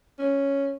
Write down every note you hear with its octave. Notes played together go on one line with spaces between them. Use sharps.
C#4